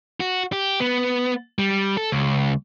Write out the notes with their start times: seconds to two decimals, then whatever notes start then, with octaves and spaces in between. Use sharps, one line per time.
0.20 F#4
0.52 G4
0.80 B3
1.59 G3
1.97 A4
2.12 C#2